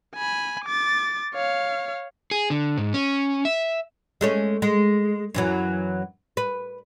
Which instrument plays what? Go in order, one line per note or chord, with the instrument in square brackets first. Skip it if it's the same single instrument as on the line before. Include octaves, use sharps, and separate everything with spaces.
[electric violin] G#5 B5
D6 A6
C#5 F5
[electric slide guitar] G#4
D3
G#2
C#4
E5
[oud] G#3 A3 C#4
G#3
F#2 E3 F#3
B4